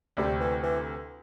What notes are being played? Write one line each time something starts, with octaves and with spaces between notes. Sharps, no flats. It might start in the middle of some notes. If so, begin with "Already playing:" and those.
D2 C3 G3 A3 C4 G4
E3
E3